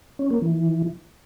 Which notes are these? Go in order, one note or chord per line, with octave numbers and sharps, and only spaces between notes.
C#4
A#3
E3